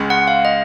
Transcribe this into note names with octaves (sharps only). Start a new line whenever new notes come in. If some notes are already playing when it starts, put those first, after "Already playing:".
Already playing: C#2 C#3 G#3
F#5
F5
D#5